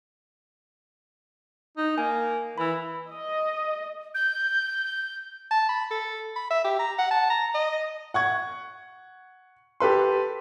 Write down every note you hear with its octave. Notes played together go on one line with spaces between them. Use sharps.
D#4
A#3 G#5
E3 B5 E6
D#5
G6
A5
B5
A4
B5
E5
G4
A#5
F#5
A5
A#5
D#5
F#5 C#6 G#6
G4 A4 B4 C6